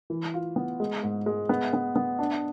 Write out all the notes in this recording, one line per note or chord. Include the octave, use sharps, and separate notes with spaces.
E3
F4
B3
G#3
G#2
G#3
B3
B3
B3
D4